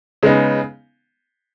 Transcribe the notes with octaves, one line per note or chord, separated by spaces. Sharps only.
C#3 G#3 B3 D#4